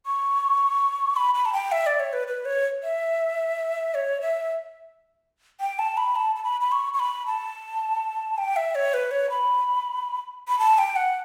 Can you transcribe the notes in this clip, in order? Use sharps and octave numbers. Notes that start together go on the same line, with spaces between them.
C#6
B5
B5
A5
G5
E5
D5
C#5
B4
B4
C#5
E5
C#5
E5
G5
A5
B5
A5
A5
B5
B5
C#6
C#6
B5
A5
G5
E5
C#5
B4
C#5
B5
B5
A5
G5
F#5